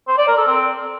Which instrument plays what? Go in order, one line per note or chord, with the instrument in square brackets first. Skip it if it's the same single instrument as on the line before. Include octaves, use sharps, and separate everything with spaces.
[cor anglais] C5
D5
A#4
A4
C4